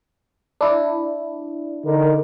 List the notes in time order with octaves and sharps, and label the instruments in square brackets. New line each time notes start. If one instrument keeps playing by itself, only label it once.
[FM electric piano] D4 E4
[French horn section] D3 D#4 A#4